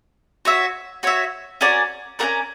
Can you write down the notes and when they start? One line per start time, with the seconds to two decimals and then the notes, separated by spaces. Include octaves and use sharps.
0.45 F#4 C#5 E5
1.03 F#4 C#5 E5
1.61 C#4 F#4 A#4 D5
2.19 C#4 F#4 A#4 D5